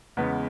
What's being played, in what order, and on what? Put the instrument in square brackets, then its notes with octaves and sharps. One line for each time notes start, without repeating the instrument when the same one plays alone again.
[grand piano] E2 C#3 G#3 B3